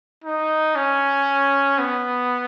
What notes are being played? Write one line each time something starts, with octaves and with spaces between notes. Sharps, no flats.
D#4
C#4
B3